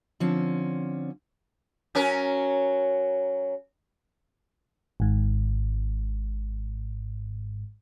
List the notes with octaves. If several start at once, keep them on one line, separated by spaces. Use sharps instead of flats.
D3 F3 C4 C#4
F#3 C#4 A#4
G#1 G#2